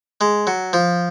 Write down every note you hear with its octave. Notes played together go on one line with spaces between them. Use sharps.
G#3
F#3
F3